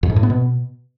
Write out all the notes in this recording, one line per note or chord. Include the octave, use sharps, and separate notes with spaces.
F2
G#2
A2
B3
B2